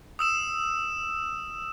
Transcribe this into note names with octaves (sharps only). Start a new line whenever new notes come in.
D#6 E6 E7